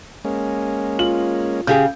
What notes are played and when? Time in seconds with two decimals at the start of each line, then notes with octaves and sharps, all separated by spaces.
0.25 G#3 A#3 C#4
0.99 F4 F#7
1.67 C#3 G4 G#4 G6